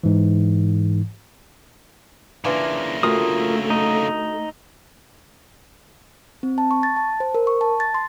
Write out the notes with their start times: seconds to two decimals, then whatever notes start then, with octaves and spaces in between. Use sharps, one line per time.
0.04 G#2 E3
2.45 C#3 E3 A#3 D4 F4
3.03 D2 A3 F4 A#4 D#6
3.70 D#4
6.43 C4
6.58 A5
6.71 C#6
6.83 A6
6.96 A5
7.20 C5
7.35 A#4
7.47 C#6
7.61 A5
7.80 A6
7.94 C6